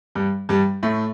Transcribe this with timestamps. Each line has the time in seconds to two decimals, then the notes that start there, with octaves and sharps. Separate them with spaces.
0.15 G2 G3
0.49 G2 G3
0.83 A2 A3